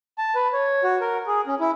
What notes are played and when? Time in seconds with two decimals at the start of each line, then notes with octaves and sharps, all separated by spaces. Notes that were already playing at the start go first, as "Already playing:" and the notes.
0.18 A5
0.35 B4
0.53 C#5
0.84 F#4
1.01 A#4
1.27 G#4
1.47 C#4
1.60 E4